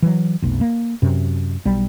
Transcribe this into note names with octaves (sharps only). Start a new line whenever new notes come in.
E3 F#3
F1 B1
A#3
F#2 C3
B1 G3